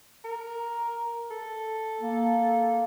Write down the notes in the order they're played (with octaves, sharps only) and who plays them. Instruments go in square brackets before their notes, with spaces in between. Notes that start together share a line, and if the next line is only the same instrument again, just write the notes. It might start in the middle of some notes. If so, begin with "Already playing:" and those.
[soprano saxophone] A#4
A4
[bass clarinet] A#3